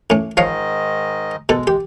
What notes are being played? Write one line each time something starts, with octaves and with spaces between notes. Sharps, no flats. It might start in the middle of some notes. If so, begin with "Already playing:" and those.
A2 C#4
G#2 D#3 F3 C#5 D#5 F5
B2 G#3 A4
G4